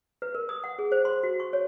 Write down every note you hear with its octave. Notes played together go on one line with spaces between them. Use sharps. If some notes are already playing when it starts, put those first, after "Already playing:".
B4
A#4
D#6
F#5
G#4
C5
C6
F#4
C#6
C#5